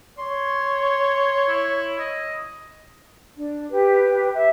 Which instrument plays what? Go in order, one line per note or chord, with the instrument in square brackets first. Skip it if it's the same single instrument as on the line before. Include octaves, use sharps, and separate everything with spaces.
[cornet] C#5 [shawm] C6
[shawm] E4
D#5
[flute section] D4
G4 B4
E5